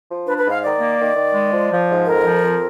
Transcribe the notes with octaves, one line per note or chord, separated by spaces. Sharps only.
F3
D4 B4
B4
G#2
F5
D#3 D5
A#3
D#3
D#3
G#3
F3
F3
G#2
F2 A#4
F3
F2